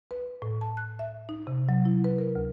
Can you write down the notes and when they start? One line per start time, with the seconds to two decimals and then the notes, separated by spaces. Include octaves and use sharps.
0.11 B4
0.42 A2
0.61 A5
0.77 F#6
0.99 E5
1.29 D#4
1.47 C3
1.69 F#3
1.85 E4
2.04 B4
2.18 A#4
2.35 D2